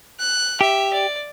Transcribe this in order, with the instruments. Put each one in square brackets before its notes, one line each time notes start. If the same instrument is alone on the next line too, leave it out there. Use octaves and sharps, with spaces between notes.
[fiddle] F#6
[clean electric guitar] G4 [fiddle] E5
[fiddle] D5